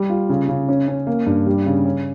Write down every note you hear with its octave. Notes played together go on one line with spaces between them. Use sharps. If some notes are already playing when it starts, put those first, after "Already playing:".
Already playing: G3
F4
C#3
C#3
C#4
C#4
A#3
G2
G3
C#3
C#4